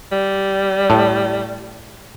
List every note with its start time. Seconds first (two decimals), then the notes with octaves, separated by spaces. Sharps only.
0.12 G3
0.90 A2